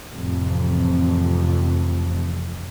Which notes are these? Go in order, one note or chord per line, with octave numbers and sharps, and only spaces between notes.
A1 F2 C3